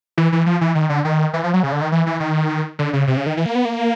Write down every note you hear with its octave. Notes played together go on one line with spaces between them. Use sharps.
E3
E3
F3
E3
D#3
D3
D#3
E3
F3
F#3
C#3
D3
D#3
E3
E3
D#3
D3
C#3
C3
C#3
D#3
E3
A#3
B3
A#3